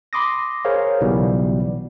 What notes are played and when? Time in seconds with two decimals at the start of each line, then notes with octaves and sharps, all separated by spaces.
0.13 B5 C6 D6 D#6 A#6
0.65 G#4 A#4 C5 C#5 F5
1.01 B1 C#3 E3 G3 B3